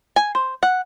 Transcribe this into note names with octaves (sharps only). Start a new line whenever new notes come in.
G#5
C5
F#5